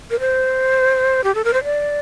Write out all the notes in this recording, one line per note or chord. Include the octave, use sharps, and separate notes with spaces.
A#4
C5
G4
A4
A#4
C5
D5